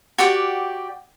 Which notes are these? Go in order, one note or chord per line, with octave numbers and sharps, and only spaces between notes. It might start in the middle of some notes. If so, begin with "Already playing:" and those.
F#4 G4 D5 G5